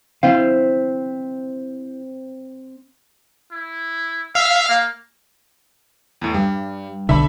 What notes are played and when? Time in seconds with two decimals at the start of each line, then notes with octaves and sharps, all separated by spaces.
0.23 C4 E4 F5
3.51 E4
4.35 E5 F5
4.69 A#3
6.22 E2 A2
6.34 G2 G3
7.09 B1 D3 E5 B5